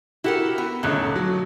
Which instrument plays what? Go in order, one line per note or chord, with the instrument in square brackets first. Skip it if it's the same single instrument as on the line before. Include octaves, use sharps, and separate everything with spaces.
[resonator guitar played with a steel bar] E4 A4 A#4 [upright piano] F#4 G4
[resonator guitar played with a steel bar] B3
[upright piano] D#1 C#4 F#6 [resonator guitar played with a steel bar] D3 D#3 A3
[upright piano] F#3